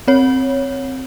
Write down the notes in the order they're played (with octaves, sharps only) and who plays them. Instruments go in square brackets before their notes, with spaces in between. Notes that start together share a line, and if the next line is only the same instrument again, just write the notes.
[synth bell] C4 C#5